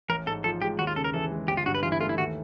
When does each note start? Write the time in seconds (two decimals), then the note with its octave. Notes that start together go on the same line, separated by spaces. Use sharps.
0.09 A1 A#4
0.26 G#2 A4
0.44 F3 A4
0.62 G#3 G4
0.79 D#2 F#4
0.87 F4
0.96 C#3 A4
1.04 A#4
1.14 E3 A4
1.32 G#3
1.48 G1 G4
1.57 F4
1.66 G2 F#4
1.75 B4
1.83 E3 F4
1.92 E4
2.00 A3 F4
2.09 E4
2.18 D#2 F#4